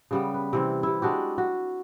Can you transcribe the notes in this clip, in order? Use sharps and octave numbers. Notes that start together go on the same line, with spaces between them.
C#3 G3 B3
B4
C3 E3 C4
C3 E4
G#3 D4 F#4 G4
F#4